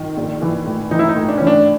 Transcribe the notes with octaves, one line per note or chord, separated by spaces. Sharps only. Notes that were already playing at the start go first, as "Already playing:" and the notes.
Already playing: D#3
A#1
E3
A2
E3 D#4
E4
D#4
A2
D4
E3 C#4
D4